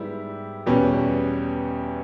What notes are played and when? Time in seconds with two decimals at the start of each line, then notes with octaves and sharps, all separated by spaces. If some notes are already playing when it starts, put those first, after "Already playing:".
Already playing: G#2 G3 B3 E4 G4
0.66 E2 B2 G3 C#4